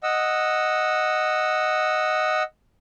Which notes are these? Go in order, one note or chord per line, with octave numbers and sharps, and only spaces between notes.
D#5 F#5 E6